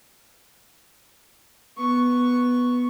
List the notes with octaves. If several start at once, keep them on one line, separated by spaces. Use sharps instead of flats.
B3 C#6